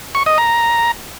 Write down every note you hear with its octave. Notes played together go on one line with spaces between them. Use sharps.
C#6
D#5
A#5